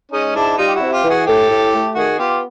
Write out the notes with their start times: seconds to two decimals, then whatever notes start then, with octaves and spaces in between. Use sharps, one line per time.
0.12 G#3 C#4 D#4
0.35 G#2 D4 E4
0.58 G3 D#4 F4
0.68 G4
0.75 E4 F#4
0.81 C3
0.92 F4 G4
1.04 E3
1.09 F#4 G#4
1.26 A2 G4 A4
1.50 A2
1.73 A3
1.95 D#3 F#4 G#4
2.18 B3 F4 G4